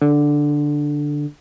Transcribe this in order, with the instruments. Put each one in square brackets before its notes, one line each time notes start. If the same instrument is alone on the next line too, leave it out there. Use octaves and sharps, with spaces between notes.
[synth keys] D3